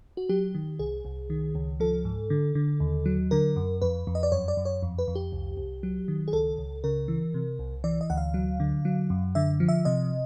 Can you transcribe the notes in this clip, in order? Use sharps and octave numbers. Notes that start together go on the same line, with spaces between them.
F#4
F#3 G4
D#3
C2 G#4
C2
D#3
C#2
F3 A4
G#2
D3
D3
D#2
F#3
D3 A#4
F#2
F2 B4
F2
D#5
D5
F#2 C#5
D5
F#2
C#5
F2
B4
F2
G4
C2
C2
F#3
D#3
G#4
C#2 A4
C#2
C#3 A#4
E3
C3
C2
E3 D5
D#5
D2 F#5
F5
F#3
D3
F#3
F#2
D3 E5
F3
E5
C3 D#5